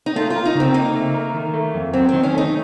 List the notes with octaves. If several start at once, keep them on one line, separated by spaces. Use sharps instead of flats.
D#4
A3 F4
F4
A#4
D#4
C#3
C4
A#3 D#4
A3
A#4
D#3
A3
F2
F#3 C4
D#3 C4
C#4
A3 D#4